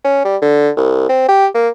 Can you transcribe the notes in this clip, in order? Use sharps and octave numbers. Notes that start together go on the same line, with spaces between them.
C#4
G3
D3
C2
C4
G4
A#3